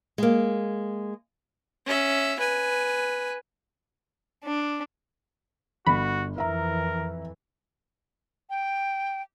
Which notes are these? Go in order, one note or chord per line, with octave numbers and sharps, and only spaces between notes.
G#3 A#3
C#4 E5
B4 G#5
D4
G1 F#4 B5
F2 E3 A#4 E5 A#5
G5